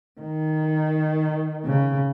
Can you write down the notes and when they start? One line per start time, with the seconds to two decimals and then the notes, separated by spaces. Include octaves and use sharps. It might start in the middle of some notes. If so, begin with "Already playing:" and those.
0.20 D#3
1.65 C#3